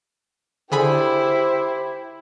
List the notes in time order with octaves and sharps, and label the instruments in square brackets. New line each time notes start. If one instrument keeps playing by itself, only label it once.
[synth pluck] D3 G#4 B5 [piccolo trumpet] E4 [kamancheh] G4 C5